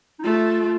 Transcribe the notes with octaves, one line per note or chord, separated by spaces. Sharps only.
D#4
A3 F4